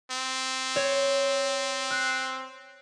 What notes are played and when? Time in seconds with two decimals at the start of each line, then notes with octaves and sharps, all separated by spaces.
0.10 C4
0.76 C#5
1.91 F#6 C7